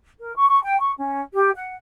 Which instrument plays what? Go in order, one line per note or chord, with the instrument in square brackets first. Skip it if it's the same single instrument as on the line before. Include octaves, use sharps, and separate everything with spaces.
[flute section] A#4
C#6
C#6
G5
C#6
C#4
G4
F#5